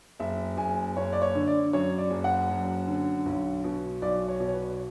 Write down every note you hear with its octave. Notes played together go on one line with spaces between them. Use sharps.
F#1 E5
F#1 G#5
F#1 C#5
D5
C#5
D3
D5
F#2 C#5
D5
F#1
F#5
F#2
D3
B1
B2
B1 D5
C#5
B2
C#5
B4